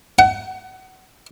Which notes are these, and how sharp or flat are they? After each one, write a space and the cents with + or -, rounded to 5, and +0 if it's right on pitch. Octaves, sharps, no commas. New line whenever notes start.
F#5 +30